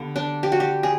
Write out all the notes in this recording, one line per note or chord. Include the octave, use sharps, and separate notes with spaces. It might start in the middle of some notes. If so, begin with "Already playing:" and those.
Already playing: D3 G3 B3
D4
G4
F#4
G4
G#4